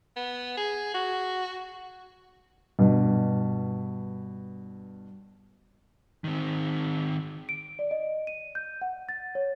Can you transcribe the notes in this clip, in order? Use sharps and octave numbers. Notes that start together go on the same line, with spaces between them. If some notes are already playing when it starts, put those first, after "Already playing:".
B3
G#4
F#4
G2 B2
D#3 C4
D7
D5
D#5
D#7
G6
F#5
A6
C#5